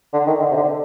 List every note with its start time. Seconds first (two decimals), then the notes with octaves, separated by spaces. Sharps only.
0.13 D3
0.27 D#3
0.41 D3
0.51 C3
0.56 D3